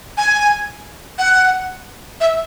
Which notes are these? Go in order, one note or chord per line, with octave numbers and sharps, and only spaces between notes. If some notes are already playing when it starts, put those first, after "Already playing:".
G#5
F#5
E5